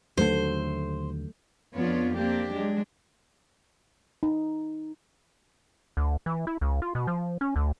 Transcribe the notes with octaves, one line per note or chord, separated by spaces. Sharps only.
D#2 D3 F#3 A3 C5
F2 B3 D4 F4 C#5
A#3 C4 D4 G4
F#3 G#3 D4
D#4
D2
E3
E4
C#2
F4
B2
F3
C#4
D2